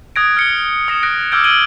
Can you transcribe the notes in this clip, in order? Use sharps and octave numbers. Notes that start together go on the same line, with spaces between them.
D#6 F#6 G#6 A#6 D7
F6 C#7 G7
D#6 A#6 C#7 E7
F#6 A#6 D7
D6 E6 F6 G6 G#6 D7
E6 G#6 D7 D#7 F#7 G7